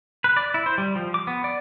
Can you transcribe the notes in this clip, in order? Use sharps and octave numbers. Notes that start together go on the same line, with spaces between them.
B4
D5
E4
C5
G3
F3
D6
B3
D5